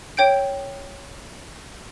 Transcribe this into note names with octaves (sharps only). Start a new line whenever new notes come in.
C#5 G5 G6 D7